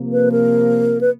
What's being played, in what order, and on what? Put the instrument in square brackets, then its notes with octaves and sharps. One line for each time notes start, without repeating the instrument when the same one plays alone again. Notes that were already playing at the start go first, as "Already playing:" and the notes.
Already playing: [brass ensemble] C3 F3 A#3
[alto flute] B4
A#4
B4